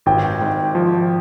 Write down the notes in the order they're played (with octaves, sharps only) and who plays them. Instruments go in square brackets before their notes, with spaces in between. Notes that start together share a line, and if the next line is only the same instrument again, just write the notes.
[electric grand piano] G#1 [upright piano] G5
[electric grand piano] G#2
F3